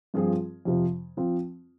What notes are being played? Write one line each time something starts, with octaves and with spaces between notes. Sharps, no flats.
G2 F3 C4 F4 G#4
F2 C3 F3
F3 C4 F4